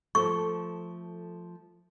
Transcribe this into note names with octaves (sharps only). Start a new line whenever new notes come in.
F3 A3 A4 C#6